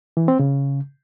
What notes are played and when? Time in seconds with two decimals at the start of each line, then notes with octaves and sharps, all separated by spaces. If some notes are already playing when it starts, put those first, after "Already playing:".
0.17 E3
0.28 C4
0.39 C#3